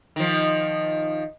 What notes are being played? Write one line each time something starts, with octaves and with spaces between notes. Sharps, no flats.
D#3 F3